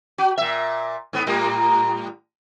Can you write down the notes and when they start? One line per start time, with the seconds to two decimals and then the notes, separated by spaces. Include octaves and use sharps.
0.18 F#4
0.38 A#2 E5
1.13 G#2 B3
1.26 A2 G3 A#3